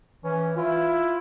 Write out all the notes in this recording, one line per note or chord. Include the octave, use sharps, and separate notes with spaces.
E3 C#4
E4 F4